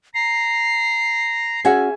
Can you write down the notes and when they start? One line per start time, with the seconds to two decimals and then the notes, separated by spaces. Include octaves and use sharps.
0.14 A#5 C7
1.65 C#4 F#4 G#4 E5 F#5 G#5